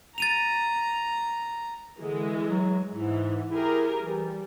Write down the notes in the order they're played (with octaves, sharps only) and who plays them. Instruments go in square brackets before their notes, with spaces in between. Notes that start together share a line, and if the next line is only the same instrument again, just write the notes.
[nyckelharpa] A#5 [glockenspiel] A6 D#7 F7
[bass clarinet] D3 [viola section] E3 G#3
[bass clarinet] F#3
[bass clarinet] G#2 [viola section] E3
[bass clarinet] E4 [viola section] G4 G#4 A#4
[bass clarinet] E3 [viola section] G3